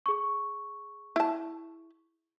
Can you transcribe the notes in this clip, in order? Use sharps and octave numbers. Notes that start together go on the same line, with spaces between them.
G#4 C#6
E4 A5